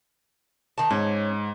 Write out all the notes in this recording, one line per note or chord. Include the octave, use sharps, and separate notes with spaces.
D#3 A5
G#2 C#4